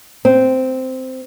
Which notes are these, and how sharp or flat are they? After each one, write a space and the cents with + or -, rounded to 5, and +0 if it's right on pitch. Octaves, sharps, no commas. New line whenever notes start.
C4 -10